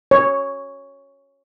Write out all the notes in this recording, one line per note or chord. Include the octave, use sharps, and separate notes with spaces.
C#5